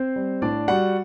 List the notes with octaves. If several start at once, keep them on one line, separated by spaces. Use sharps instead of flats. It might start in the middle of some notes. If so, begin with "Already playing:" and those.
Already playing: C4 C5
G3
A2 D4 D5
G3 F#4 F#5